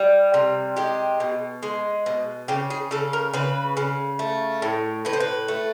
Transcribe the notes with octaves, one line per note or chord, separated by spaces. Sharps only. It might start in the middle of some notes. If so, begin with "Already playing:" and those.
Already playing: G3
C3
G#3 G4
B2
G#3
B2
C#3 G4
G#4
C#3 A4
A#4
C#3 B4
C#3
A3
A2
A2 B4
C5
B4
A3